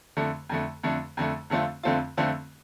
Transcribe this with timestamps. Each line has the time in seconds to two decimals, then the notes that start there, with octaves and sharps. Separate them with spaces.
0.17 F2 D3 A3
0.49 F2 D3 A3
0.83 F2 D3 A3
1.17 F2 D3 A3
1.50 F2 D3 A3 C4 F4
1.83 F2 D3 A3 C4 F4
2.17 F2 D3 A3 C4 F4